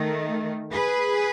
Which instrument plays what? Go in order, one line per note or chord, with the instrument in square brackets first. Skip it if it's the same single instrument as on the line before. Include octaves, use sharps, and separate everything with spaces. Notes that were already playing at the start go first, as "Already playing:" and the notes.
Already playing: [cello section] D#3 A3
G#4 B4